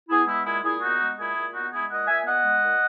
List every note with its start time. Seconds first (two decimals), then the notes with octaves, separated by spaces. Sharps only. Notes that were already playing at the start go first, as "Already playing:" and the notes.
0.09 B3 E4 G#4
0.27 G#3 E4
0.45 A#2 E4 G#4
0.63 A#2 E4 G#4
0.82 B3 D#4 F#4
0.99 G#3
1.18 A#2 E4 G#4
1.36 A#2
1.53 B3 D#4 F#4
1.71 G#3 E4 G#4
1.89 A#2 D#5 F#5
2.07 A#2 E5 G#5
2.25 B3 D#5 F#5
2.44 G#3
2.63 A#2